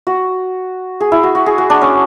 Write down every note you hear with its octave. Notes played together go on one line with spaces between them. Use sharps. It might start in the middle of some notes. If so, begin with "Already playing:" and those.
F#4
G#4
E4
F#4
F#4
G#4
F#4
D4
C#4